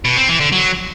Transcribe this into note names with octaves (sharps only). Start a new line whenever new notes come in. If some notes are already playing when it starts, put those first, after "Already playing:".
B2
C4
E3
D3
F#3